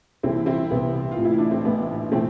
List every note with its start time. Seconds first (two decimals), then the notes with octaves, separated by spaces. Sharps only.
0.23 C2 C3 E3 C4 E4
0.46 C4 E4
0.70 C2 C3 E3 B3
1.11 F4
1.18 A1 A2 E3
1.25 E4
1.38 D4
1.51 C4
1.64 A1 A2 E3 B3
2.12 C3 E3 A3 C4